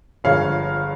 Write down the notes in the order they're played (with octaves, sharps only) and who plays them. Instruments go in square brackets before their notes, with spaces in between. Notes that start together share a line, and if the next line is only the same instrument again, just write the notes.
[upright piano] G1 G2 F3 G#3 C#5 F5